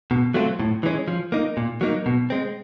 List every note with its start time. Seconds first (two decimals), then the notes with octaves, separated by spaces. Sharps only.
0.11 B2
0.34 F#3 A3 C4 F4
0.59 A2
0.83 E3 G#3 C#4
1.08 F3
1.32 A#3 D#4
1.57 A#2
1.81 F#3 A#3 D#4
2.06 B2
2.30 G#3 C4